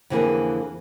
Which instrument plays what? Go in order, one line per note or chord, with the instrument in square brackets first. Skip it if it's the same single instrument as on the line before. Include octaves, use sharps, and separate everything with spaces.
[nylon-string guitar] F2 D3 E3 A#3 G#4